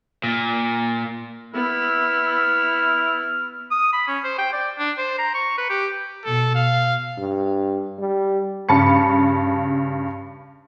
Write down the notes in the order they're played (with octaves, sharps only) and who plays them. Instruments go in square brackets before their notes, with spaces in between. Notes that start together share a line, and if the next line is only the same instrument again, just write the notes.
[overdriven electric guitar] A#2
[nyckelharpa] B3 [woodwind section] E4 [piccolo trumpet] F6
[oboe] D#6
B5
C#4
C5
G5
D5
D4
C5
A#5
C#6
B4
G4
[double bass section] B2 [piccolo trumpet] A4
[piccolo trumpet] F5
[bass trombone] G2
G3
[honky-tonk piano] G2 C#3 A5 B5 C#7